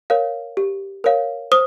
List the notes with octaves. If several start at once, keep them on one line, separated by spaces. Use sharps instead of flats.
A#4 C#5 F5
G4
A#4 C#5 F5
C5 D#6